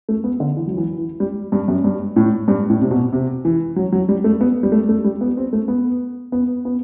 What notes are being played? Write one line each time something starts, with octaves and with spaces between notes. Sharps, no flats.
A3
B3
D3
E3
F#3
E3
E3
G3
G2
F#2
G2
A2
G2
A2
C3
B2
C3
E3
F#3
F#3
G3
A3
B3
G3
A3
A3
G3
B3
C4
A3
B3
B3
B3